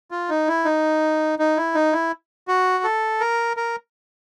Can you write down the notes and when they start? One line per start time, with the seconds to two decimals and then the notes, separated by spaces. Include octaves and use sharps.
0.11 F4
0.29 D#4
0.48 E4
0.65 D#4
1.39 D#4
1.57 E4
1.75 D#4
1.93 E4
2.48 F#4
2.84 A4
3.20 A#4
3.57 A#4